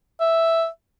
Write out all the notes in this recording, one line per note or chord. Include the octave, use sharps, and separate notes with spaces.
E5